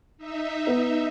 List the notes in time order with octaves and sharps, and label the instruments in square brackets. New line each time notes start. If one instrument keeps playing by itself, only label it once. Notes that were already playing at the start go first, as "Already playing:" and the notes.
[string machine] D#4 E5
[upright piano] B3